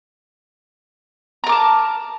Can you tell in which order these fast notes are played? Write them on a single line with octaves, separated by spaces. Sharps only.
A#5 A#4 D6 A5